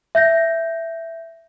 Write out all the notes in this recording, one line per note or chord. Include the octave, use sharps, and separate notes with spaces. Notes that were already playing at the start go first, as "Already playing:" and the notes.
E5 G6 A#6